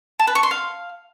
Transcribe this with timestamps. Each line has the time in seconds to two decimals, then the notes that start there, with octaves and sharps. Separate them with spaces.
0.19 A5
0.27 B4
0.35 C#6
0.43 C6
0.51 F5